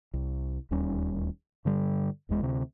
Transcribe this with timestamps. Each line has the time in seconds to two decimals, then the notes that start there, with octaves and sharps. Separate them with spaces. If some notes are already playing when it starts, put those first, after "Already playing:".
0.14 C2
0.71 D1 D#2 G3 C#4
1.65 G2 D3 G3
2.29 F1 E2 G#3
2.41 D2 C3